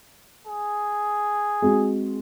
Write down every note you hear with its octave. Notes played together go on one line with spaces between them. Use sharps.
G#4
G#3 C4 F#4